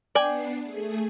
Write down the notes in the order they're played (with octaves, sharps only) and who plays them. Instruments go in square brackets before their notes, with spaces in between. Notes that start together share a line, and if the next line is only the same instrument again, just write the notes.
[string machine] B3 D4 C7 [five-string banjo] D5 G5 G#5
[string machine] A3 G#4